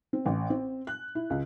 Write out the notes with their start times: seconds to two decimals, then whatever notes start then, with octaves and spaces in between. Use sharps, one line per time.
0.13 C4
0.26 A1
0.50 C4
0.87 F#6
1.15 E4
1.30 C#2